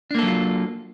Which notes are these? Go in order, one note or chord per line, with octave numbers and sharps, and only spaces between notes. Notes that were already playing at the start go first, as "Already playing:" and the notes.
F#3 A#3 D4 F4 A4